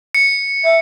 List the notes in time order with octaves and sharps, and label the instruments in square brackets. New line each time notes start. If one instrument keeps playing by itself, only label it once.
[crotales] C#7
[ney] E5